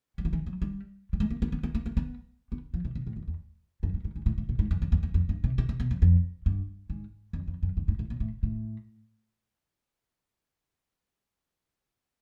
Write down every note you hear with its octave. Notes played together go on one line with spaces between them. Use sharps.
F#3
F3
E3
F#3
G3
G3
G#3
A#3
B3
B3
B3
A#3
A#3
B3
B3
F3
C3
B2
A2
F2
E2
F#2
G#2
G#2
G#2
A2
A2
A#2
G#2
F#2
F2
E2
F2
F2
G2
C3
C3
C3
B2
F2
F2
G2
G#2
F2
F2
F#2
G2
G#2
A2
A#2
A2
A2